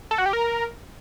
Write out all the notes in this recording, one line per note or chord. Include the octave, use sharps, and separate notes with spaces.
A4
F#4
G4
A#4